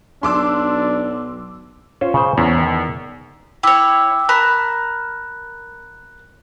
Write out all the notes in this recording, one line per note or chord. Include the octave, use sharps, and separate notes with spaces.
B1 D4 C6 D6 E6
C#4 F4 C5 C#5
C#3 C5
E2 C#4
D#3
E4 C#5 G5 D6 E6
A#4 A5 B5 F#6